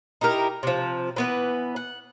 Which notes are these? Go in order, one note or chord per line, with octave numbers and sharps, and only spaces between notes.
D#4 E4 G4 A#4
C3 F3
E3 B3 B4
F#5